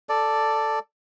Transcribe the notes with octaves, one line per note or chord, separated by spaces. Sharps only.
A4 D5